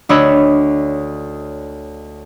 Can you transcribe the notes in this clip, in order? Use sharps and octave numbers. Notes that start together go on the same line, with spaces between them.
D2 D4 C#5 D#5 B5 E6